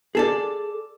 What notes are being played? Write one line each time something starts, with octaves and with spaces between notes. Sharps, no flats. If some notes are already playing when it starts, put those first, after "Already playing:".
G#4 A4 D5